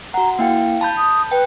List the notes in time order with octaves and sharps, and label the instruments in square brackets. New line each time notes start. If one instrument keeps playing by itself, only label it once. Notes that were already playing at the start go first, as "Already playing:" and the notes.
[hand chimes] F#4 F#5 [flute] A#5
[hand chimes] A#3 E4 G5 [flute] F5
[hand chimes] A5 B5 G6
[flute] D#6
[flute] B4 [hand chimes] G5